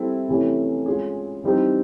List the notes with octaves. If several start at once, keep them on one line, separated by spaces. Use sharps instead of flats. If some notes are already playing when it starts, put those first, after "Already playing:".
Already playing: G3 C4 E4 A4
C3 E3 A3 C#4
G#3 C#4 F4 G#4
E3 G3 C4 D#4